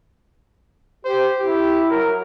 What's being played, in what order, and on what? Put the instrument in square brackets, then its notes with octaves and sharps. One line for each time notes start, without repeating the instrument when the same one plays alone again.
[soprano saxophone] G4 [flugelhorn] C5
[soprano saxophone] E4 [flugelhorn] G4
[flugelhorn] F#3 [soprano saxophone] A#4